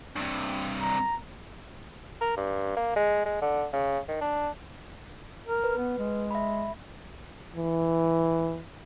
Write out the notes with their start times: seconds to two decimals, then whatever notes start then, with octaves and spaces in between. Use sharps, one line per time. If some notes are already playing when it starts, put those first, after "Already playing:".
0.17 G2 C3
0.81 A#5
2.21 A#4
2.37 G2
2.77 A#3
2.96 G#3
3.25 G#3
3.42 D3
3.73 C#3
4.09 D#3
4.22 D4
5.47 A#4
5.64 B4
5.78 B3
5.98 G#3
6.31 E5 B5
7.56 E3